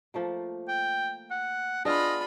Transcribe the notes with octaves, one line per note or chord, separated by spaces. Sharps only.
F3 A3 A#3
G5
F#5
B3 D4 F4 G#4 D#5 B5